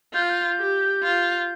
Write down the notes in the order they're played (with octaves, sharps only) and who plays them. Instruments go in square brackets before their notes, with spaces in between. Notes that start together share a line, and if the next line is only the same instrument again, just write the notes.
[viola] F4 [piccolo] G6
[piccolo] F6
G6
[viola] G4
F4